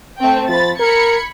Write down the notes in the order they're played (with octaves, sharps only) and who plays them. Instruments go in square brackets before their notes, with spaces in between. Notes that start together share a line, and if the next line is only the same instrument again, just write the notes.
[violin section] A3 C4 G5
[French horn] F3 [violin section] B5 A6
[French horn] A#4 [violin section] B5 G#6 C#7